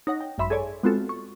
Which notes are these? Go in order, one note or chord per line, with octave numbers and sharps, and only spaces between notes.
D#4 C#5 F#5 A#6
G5
G#1 F#2 E5 B5 C6 B6
G#4 A4 C#5 D5 G#5
G#3 B3 C4 F4 F#4 A4
C#6